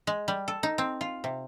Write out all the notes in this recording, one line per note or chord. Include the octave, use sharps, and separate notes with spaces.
G#3
G3
A4
D#4
C4
F4
C3